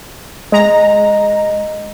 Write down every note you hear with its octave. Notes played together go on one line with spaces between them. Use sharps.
G#3 D#5 A#5